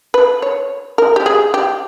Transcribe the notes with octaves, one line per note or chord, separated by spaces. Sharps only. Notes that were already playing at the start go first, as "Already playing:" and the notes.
B4
C#5
A#4
G4
G#4
G4